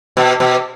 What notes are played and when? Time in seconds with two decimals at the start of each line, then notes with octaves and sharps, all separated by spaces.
0.17 B2
0.40 B2